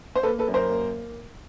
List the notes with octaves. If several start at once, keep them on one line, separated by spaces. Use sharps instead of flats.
C5
A#3 A4 B4
A4 B4
F#2
A#4 C5
A#3